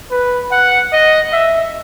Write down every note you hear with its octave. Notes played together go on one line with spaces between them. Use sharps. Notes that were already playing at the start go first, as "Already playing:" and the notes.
B4
F#5
D#5
E5